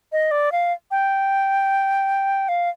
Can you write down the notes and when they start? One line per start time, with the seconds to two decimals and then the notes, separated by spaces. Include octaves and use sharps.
0.12 D#5
0.31 D5
0.52 F5
0.91 G5
2.49 F5